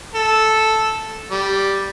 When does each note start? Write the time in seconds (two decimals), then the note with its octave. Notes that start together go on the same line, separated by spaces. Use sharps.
0.15 A4
1.31 G3